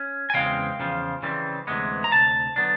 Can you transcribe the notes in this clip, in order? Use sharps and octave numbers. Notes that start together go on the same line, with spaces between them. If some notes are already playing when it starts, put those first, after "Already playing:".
Already playing: C#4
G#5
E2 C#3 E3 G#3 C4 F5 G5
E2 C#3 F3
C#3 E3 G3 C4
D2 C3 E3 G#3 B3
A#5
D2 C3 A5
D3 F#3 B3 D4